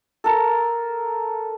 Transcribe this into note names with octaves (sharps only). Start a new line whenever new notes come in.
A4 A#4